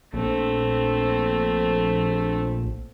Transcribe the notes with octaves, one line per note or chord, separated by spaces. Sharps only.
A#1 A3 C4